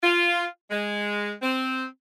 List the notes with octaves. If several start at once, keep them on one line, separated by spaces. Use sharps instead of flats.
F4
G#3
C4